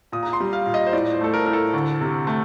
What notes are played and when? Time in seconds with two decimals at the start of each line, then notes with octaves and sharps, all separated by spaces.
0.12 A#2 D#6
0.23 A#5
0.33 C6
0.40 G3
0.53 F5
0.66 A#2
0.74 D#5
0.87 C5
0.93 A2 D5
1.13 C5
1.21 A3 A4
1.34 A#4
1.46 A2 A#4
1.53 A4
1.73 D2
2.01 C3
2.27 A3